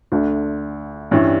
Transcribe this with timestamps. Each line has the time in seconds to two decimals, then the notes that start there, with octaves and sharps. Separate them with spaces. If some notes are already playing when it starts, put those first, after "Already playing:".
0.12 D2 D3 A3 D4
1.11 G2 E3 G3 C#4 E4